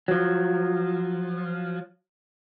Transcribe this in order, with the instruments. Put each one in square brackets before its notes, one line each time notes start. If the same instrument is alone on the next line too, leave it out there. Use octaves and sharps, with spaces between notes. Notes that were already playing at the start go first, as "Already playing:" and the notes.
[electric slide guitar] F3 F#3